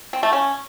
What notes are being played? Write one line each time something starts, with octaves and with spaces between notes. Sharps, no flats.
C4
A3
C#4